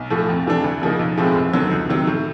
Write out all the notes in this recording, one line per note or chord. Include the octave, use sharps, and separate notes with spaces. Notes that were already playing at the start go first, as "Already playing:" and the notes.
Already playing: B1
A2 F3 A3
F2
C3 E3 A3 D4
D2
C#3 F3 A#3 D#4
B1
A2 F3 G#3 C4
F1
D#2 D3 F#3
C#2
C3 D#3 F#3
A2